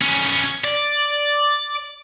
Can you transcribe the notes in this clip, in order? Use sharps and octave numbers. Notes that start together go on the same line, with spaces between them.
B3 C#4
D5